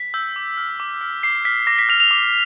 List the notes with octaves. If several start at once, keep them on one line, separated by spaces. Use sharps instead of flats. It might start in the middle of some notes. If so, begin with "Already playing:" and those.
Already playing: B6
E6 G6
D6
F6
D6
F6
D6 C7
F6 B6
D6 A#6
B6
F6 F7
F7
D6